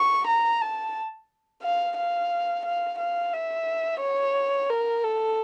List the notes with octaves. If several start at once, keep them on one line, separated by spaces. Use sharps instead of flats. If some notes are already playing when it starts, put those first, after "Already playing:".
Already playing: C#6
A#5
A5
F5
F5
F5
F5
E5
C#5
A#4
A4